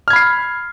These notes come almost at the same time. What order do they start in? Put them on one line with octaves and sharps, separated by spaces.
F6 G#6 B5 C7